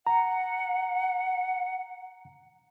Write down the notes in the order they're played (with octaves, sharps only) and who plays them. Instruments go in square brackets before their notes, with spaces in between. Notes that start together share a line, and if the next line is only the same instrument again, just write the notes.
[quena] F#5 [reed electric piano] A#5